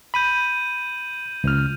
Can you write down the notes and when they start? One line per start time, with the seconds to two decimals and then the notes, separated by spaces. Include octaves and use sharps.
0.14 B5 G6 D#7 F#7
1.44 C#2 F6